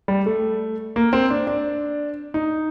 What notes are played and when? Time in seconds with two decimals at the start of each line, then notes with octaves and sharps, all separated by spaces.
0.08 G3
0.26 A3
0.96 A#3
1.13 C4
1.30 D4
1.47 D4
2.34 D#4